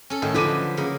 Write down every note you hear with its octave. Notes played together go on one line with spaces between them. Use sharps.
C#4 A4
A2 D#3
D3 F3 F#3 B4 D6 D#7
C#3 A#3